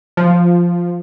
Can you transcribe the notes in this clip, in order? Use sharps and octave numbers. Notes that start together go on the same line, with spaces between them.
F3